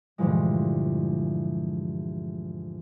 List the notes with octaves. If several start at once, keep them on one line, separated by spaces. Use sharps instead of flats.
D2 G2 A#2 E3 F3 G#3